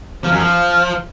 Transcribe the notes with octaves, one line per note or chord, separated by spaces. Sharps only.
F3
F#2
F3